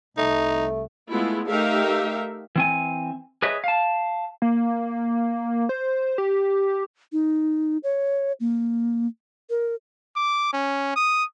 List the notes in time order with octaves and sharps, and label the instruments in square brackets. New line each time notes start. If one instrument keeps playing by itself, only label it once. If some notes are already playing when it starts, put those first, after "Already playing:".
[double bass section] C2 [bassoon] A3 [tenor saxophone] D#4
[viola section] G#3 A3 B3 E4 F4
A3 D#4 G4 A#4 E5 F5
[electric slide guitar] E3 C4 G#5
G#4 B4 C#5 D#5 E5
F5 A5
[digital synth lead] A#3
C5
G4
[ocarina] D#4
C#5
A#3
A#4
[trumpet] D6
C#4
D#6